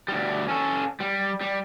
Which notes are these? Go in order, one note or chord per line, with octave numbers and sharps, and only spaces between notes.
D2 G3
C#4 A4
G3
G3